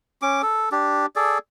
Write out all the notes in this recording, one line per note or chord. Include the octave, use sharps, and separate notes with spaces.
C#4 D6
A4
D4 G4
G#4 A4 D5